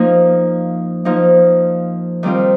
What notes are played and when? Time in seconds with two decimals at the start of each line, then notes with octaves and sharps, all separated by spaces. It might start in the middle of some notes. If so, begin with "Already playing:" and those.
Already playing: F3 A#3 D#4
1.05 F3 A#3 D#4
2.23 D#3 G3 C4 F4